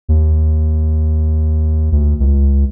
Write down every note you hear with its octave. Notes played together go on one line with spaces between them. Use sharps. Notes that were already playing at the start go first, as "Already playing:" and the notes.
D#2
D2
C#2